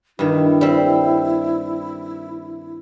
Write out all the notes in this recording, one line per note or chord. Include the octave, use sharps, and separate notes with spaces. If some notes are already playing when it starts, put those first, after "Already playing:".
G2 D#3 E4
G3 C4